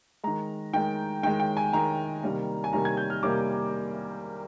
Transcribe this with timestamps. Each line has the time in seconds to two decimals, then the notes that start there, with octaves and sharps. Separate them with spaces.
0.24 D#3 G#3 A#5
0.73 D#3 G#3 G5
1.23 D#3 G#3 G5
1.40 G5
1.57 G#5
1.73 D#3 G#3 A#5
2.23 C3 D#3 G3 A#3
2.64 G#5
2.73 C3 D#3 G3 A#3 A#5
2.85 G#6
2.97 G6
3.10 F6
3.23 C3 D#3 G3 A#3 D6